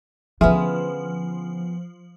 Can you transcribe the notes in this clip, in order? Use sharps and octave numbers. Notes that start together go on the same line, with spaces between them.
D3 F3 B3 C#4 G#4 E5